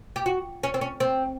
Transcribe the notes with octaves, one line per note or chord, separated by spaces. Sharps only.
G4
F#4
C#4
C4
C#4
C4